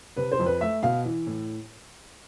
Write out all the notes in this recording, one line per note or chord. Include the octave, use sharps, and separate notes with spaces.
C3 B4
C5
F2
B4
A3 E5
B2 F5
E3
A2